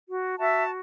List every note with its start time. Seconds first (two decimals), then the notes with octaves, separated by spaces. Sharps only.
0.09 F#4
0.38 F#4 E5 A5